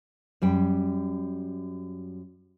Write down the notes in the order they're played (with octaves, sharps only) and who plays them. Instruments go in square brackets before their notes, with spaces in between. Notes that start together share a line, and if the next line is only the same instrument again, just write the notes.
[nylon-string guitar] F#2 G3 G5